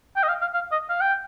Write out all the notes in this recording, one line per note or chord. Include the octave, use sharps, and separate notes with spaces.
G5
D#5
F5
F5
F5
D#5
F5
G5